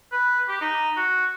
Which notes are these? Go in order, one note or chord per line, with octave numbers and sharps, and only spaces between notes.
B4
G4
D#4
F#4